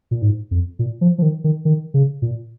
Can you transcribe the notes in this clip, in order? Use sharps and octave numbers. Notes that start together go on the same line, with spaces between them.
A#2
G#2
F2
A#2
F3
F3
D#3
D#3
D#3
C#3
A#2